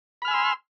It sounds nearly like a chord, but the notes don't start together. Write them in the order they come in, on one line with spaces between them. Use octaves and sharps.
B5 F6 G#5 E6 C6